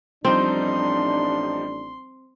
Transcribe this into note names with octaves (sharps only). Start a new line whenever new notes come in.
A1 F3 G3 C4 D4 D#4 C6